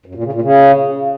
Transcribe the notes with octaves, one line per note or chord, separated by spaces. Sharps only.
F#2
A#2
C#3
A#2
C#3